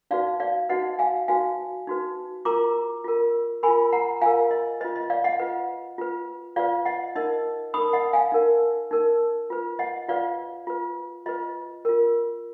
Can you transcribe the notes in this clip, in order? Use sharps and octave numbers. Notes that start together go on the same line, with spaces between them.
D#4 F#4 B4 D5 F5
D5 F5
D#4 F#4 B4 D#5 F#5
F5 G#5
D#4 F#4 B4 F5 G#5
D#4 F#4 B4
F4 A#4 A#5 D6
F4 A#4
F4 A#4 G#5 B5
F#5 A#5
F4 A#4 F5 G#5
D#5
F4 B4 D#5
D#5
D5 F5
D#5 F#5
F4 B4
F4 B4
F4 B4 D5 F5
D#5 F#5
D#4 A#4 D#5
D#4 A#4 B5 D#6
D#5 F#5
F5 G#5
D#4 A#4
D#4 A#4
F4 B4
D#5 F#5
F4 B4 D5 F5
F4 B4
F4 B4 D#5
F4 A#4